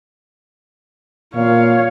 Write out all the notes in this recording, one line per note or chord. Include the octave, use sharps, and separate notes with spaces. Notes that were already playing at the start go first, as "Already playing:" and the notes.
A#2 C#5 F5